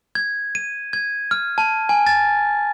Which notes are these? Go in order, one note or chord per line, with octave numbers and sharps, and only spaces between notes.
G#6
D#7
G#6
F6
A5
G#5
A6